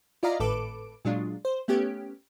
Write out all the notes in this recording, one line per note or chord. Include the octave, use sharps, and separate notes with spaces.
E4 F4 D5 D#5 F5 A#5
G#1 A2 A4 B4 D6 D7
A#2 F#3 G#3 D4 F4
C5
A3 B3 C#4 G4